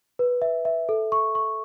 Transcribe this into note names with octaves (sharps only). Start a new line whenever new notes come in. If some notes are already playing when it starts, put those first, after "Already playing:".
B4
E5
E5
A4
C#6
C#6